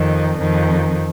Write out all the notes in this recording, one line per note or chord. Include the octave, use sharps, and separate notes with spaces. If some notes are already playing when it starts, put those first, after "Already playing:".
Already playing: F2 D#3
F2 D#3